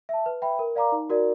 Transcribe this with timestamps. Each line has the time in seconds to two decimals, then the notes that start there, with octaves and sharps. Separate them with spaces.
0.09 E5 A5
0.26 B4
0.42 E5 G5 B5
0.59 A#4
0.76 D5 F5 A#5 D6
0.92 D#4
1.09 F#4 A#4 D5